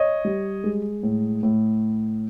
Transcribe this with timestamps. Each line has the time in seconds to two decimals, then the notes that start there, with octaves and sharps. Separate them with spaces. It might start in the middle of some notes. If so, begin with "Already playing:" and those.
Already playing: C#5 D#5
0.25 G3
0.64 G#3
1.03 A2
1.43 A2